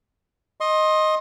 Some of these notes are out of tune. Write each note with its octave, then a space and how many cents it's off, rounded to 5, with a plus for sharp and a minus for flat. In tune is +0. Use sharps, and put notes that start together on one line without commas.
D#5 +0 C6 +25